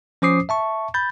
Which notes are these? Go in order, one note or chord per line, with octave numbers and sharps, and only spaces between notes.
F3 C#4 C5 D6 D#6 C7
E5 A5 C#6
B5 G6 A6